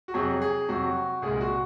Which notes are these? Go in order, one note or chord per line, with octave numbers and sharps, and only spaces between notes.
F#4
F2 C3 F#3 G#4
G#4
F2 C3 F#3 F#4
C2 A#2 G#3 G#4
F#4